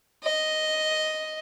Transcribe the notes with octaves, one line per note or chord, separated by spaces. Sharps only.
D#5